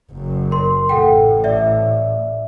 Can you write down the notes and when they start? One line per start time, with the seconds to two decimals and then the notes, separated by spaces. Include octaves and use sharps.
0.11 F#1 F#2
0.51 A#4 C6
0.89 A1 A2 A4 F#5 G5
1.44 D5 E5